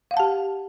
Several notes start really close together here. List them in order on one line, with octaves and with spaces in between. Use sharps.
F5 F#5 A5 G4